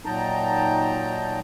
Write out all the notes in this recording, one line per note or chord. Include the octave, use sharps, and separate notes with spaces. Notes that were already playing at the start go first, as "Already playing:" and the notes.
A#2 F#3 D#4 G5 A5 A#5